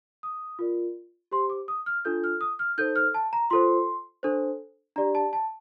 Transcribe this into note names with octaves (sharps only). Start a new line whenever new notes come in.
D#6
F4 A#4 D5
G4 C5 C6
D6
D#6
F6
D4 F4 A4 G6
F6
D#6
F6
D#4 A4 C5 G6
F6
A5
A#5
F4 A4 C5 C6
D4 A4 C5
D4 G4 D5 A#5
A5
A5